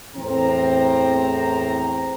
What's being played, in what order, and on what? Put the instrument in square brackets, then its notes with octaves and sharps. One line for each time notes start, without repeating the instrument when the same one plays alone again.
[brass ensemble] E2 A2 C4 A#5